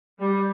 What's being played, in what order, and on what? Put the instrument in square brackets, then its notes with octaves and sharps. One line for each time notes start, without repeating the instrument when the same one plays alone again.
[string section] G3